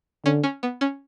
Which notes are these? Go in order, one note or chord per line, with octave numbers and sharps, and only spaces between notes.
D3 C#4
C#4
B3
C#4